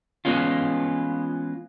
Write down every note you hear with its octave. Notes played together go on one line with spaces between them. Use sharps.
E3 G#3 B3 C#4 F4